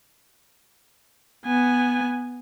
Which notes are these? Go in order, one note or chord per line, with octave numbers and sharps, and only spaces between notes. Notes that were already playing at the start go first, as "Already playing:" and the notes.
B3 G#5